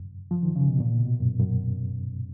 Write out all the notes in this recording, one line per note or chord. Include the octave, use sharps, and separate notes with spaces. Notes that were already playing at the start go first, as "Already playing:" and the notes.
Already playing: F#2
F3
D#3
C#3
B2
A#2
B2
F#2
F#2